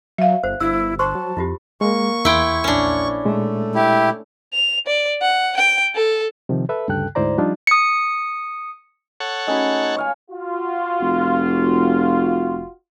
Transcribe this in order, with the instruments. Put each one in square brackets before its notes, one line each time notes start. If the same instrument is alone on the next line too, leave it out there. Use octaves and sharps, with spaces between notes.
[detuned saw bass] F#3 [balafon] E5 F5
[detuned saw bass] G1 [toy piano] C5
[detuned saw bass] G1 [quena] E4 [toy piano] E6
[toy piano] C5 C6 C#6 [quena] A5
[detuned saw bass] F#3
[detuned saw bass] F2 [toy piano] E4 F4 G4
[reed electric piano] G#3 [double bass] A#3 [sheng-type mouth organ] C#6
[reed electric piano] E2 C6 G#6 [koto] E4 G5
[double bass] A#1 [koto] C#4 D4
[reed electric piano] A#2 G#3 [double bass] A3
[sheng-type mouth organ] E4 G4
[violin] F7
D5
F#5
G5
A4
[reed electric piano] C3 D#3 F3
A4 B4 E5
D2 G2 C#3 A4 G5 F#6
D2 G#2 E4 C5 D5 A#5
F3 G3 D4 D#4 F4
[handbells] D#6 C#7
[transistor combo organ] A4 C#5 F#5
[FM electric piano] A3 C#4 F#4 [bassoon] D#4 [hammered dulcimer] G#4 B5
[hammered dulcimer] C#5 F5 G#5
[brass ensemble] F4 F#4
[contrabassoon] F1